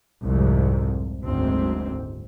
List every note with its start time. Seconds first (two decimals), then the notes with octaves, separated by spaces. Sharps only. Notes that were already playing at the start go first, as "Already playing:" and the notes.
0.23 C2 F2 G#2 C3
1.23 F#1 D2 G#2 C4